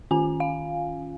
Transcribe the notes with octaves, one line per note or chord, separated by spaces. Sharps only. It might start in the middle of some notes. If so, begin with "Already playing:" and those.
D#3 C#4 F4 G#5
F5